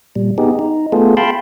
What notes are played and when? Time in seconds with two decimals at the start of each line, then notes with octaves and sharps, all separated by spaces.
0.16 A#2 G3
0.38 B3 D#4 G4 G#4
0.59 D#4
0.92 A3 B3 F4 G#4 A4
1.17 F5 G5 A5 B5 C6